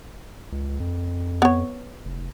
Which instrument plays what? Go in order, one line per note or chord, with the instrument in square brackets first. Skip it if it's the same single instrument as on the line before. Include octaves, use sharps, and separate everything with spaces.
[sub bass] C#2
F2
[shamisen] B3 C#5
[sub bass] F1